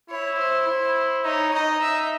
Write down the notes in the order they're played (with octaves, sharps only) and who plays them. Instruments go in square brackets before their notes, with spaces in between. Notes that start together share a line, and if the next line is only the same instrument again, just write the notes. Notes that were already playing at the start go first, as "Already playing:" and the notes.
[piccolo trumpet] E4 [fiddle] C#5
[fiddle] C5
[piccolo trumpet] E4
[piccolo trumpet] D#4 [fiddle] C#5
[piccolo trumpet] D#4 [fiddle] D#5
[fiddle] E5